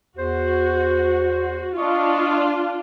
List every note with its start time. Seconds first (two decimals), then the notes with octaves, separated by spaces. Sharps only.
0.17 E2 F#4 C5
1.77 D4 F4 D#5 C#6